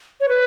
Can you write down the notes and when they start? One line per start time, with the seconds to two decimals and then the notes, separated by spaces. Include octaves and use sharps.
0.21 C#5
0.29 B4